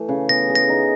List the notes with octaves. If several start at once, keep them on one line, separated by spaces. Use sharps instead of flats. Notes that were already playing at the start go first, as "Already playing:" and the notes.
Already playing: E3 A3
C#3
B3 A#6
G#4
A#6
D#4